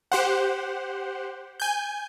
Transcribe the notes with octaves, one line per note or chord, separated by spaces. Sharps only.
G4 C5 F#5
G#5 G6